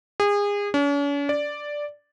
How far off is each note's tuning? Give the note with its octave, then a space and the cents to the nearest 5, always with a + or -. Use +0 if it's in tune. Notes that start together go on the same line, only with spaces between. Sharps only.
G#4 -30
C#4 +45
D5 +0